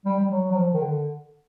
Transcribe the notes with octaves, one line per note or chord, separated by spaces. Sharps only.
G3
G3
F#3
F#3
F3
D#3
D3